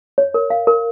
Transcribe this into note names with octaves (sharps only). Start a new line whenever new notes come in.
C#5
A#4
F5
A#4